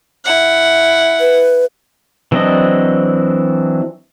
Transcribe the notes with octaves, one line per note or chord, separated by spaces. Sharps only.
E4 F#5
B4
E3 F#3 C4 D4 D#5